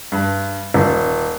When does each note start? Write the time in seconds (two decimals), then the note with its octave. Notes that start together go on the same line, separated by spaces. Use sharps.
0.12 G2
0.74 D#1